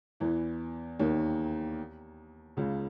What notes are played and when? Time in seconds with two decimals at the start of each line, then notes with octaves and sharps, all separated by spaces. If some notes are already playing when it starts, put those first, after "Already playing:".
0.20 E2 E3
0.99 D#2 D#3
2.57 C#2 C#3